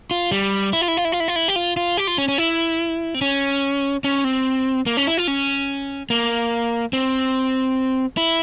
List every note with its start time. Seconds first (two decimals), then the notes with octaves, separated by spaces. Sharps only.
0.11 F4
0.31 G3
0.73 E4
0.81 F4
0.88 E4
0.97 F4
1.05 E4
1.12 F4
1.20 E4
1.28 F4
1.36 E4
1.48 G4
1.56 F4
1.77 F4
1.97 G4
2.07 F4
2.18 C#4
2.28 C#4
2.38 E4
3.14 C4
3.22 C#4
4.04 C#4
4.24 C4
4.86 A#3
4.97 C#4
5.07 E4
5.17 F4
5.28 C#4
6.10 A#3
6.93 C4
8.17 E4